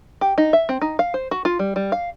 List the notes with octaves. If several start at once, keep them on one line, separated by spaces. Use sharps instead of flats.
G4
D#4
E5
C4
D#4
F5
C5
F#4
F4
G3
G3
F5